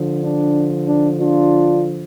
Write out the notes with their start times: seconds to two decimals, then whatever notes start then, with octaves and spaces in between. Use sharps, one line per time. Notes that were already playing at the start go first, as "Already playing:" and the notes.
Already playing: D3 F3
0.22 D4
0.87 D4
1.19 D4 F4